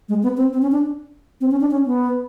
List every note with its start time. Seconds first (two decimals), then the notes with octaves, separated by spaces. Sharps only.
0.09 G#3
0.23 B3
0.37 C4
0.53 C4
0.62 C#4
0.72 D4
1.41 C4
1.51 C#4
1.61 D4
1.71 C#4
1.86 B3